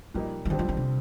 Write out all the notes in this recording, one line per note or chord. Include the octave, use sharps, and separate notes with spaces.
A#2 F3 G3 A#3 D#4
F3
F2 D3 D#3 G3 C4
F3
D#3
C3